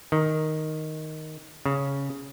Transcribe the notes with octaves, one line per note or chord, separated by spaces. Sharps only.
D#3
C#3